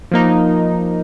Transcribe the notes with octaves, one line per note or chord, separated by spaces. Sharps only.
F3 A#3 D#4